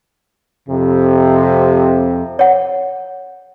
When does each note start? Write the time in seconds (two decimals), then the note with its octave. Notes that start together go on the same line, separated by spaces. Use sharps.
0.68 F2 C3
2.39 C#5 F#5